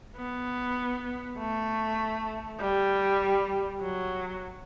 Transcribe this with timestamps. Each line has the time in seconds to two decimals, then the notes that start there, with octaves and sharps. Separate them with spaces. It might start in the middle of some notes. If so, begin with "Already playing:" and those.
0.17 B3
1.38 A3
2.60 G3
3.81 F#3